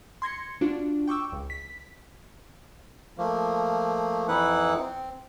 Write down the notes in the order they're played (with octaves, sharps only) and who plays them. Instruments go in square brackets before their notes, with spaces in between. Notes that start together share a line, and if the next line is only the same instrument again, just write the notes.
[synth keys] C6 G#6 A#6 C#7
D4 F4 F#4
G5 C#6 D6 E6
C#2
B6
[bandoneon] F3 A3 A#3
F2 E3 D#4 E4 B4 F#5
C4